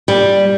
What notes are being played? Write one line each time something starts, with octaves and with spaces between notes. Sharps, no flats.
G3